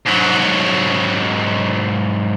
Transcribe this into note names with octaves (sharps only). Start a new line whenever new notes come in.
G#2 F#3